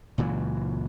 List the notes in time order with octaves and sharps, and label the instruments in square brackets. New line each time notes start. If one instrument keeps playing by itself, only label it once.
[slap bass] C#2 A#2 E3 F#3